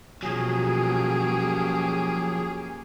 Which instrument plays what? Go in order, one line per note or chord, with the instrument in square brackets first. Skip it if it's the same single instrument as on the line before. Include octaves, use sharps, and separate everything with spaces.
[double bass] B2 [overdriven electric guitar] F3 F#3 [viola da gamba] A#3 C#4 G4 [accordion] G#4